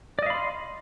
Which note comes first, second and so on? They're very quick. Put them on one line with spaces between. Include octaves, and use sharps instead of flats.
D5 D#5 F5 B5 C6